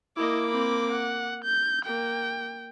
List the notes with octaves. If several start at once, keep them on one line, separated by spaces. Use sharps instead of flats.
A#3 E4 D#5 D6
C4 B5
F#5
G6
A#3 G5